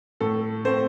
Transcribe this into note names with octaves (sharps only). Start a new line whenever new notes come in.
A2 A4
A3 C4 C5